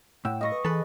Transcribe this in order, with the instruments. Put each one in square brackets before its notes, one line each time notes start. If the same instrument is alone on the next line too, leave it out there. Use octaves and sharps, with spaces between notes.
[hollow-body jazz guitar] A2 [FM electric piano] F#5 G5 E6
[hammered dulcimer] D#5 C#6 [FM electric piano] F5 B5 A#6
[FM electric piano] B4
[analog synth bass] E3 [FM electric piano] G#4 [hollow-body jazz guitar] A4 B4